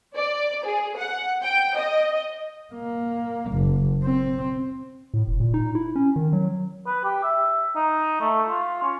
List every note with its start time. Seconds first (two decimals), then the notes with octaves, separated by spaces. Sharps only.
0.16 D5
0.65 G#4
0.97 F#5
1.43 G5
1.76 D#5
2.74 A#3
3.52 F#1
4.04 C4
5.14 A2
5.27 F1
5.40 A#2
5.54 D#4
5.75 E4
5.96 C#4
6.16 D#3
6.33 F#3
6.87 B4
7.04 G4
7.23 E5
7.76 D#4
8.20 A3
8.49 F4
8.83 C#4